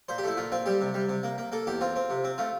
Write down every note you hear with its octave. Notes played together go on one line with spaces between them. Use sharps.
A#2 C5
G4
A3 E4
A#2 F4
C4 F4
G3 G4
C3
G3
C3
A#3
A#3
A#3 A4
E2 G4
C4 F4
C4
C3
C4
A3 F4